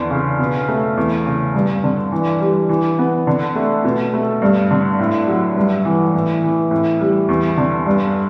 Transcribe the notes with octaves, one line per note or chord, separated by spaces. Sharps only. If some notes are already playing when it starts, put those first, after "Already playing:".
Already playing: E2 D3
C#3
B2
A3
E2
C#3
G2
D3
E3
G3
E3
B3
D3
A3
B2
A3
G2
D3
A2
F#3
G2
E3
A2
E3
A2
G3
E2
D3
G2